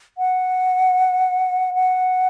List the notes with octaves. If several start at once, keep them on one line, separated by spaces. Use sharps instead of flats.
F#5
F#5